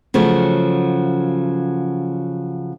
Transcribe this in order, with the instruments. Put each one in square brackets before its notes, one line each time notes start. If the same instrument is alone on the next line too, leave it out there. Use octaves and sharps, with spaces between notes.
[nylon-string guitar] C#3 F3 F#3 A3